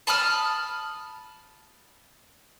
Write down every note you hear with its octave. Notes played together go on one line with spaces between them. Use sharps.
A5 B5 D#6 F6